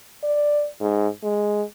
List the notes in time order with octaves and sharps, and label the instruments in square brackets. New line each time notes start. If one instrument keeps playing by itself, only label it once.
[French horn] D5
G#2
G#3